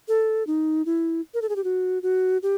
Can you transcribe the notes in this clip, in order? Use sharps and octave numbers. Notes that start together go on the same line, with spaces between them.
A4
D#4
E4
A#4
A4
G#4
G4
F#4
F#4
G4